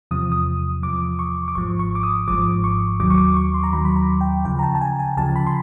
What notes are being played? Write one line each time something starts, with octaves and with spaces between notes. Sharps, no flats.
E2 C3 F3 D#6
D#6
E2 C3 F3 D6
C#6
D6
G#1 G#2 F3 C#6
C#6
D6
D#6
G#1 G#2 F3 D6
C#6
D#2 D#3 F#3 D6
C#6
D6
C#6
C6
A#5
D#2 D#3 F#3 B5
B5
A#5
G5
D2 C#3 F3 G5
A#5
A5
A5
G#5
G#5
D2 C#3 F3 A5
B5
C6